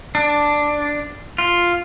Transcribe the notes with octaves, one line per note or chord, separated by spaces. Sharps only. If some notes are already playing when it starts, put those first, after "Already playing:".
D4
F4